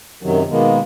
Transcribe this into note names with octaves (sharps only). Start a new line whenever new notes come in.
F#2 C3 D#3 F#3
B2 D#3 G#3 A#3 B3